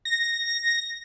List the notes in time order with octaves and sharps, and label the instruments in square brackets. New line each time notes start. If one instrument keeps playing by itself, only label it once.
[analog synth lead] A#6